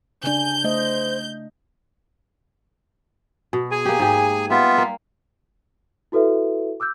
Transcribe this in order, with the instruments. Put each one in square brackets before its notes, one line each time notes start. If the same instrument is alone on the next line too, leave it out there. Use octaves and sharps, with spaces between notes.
[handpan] C#3 D4 [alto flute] G#5 [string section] G6
[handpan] A3 D#5 [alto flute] C5
[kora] B2
[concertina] G#4 G#5
[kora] A#3 G4
G#2 G4
[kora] G3 [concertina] B3 F4 E5
[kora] A#3
[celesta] E4 F#4 A4 B4 E5
D6 E6 F#6 G6